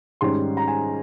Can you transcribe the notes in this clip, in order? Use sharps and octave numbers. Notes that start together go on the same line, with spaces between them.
G#2 D#3 G3 C#4 C6
A#5
G#5